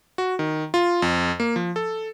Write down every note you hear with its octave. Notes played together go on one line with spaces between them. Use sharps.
F#4
D#3
F4
F2
A#3
F3
A4